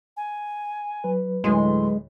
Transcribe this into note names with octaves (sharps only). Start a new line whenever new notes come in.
G#5
F#3 B4
D2 A2 G#3 C6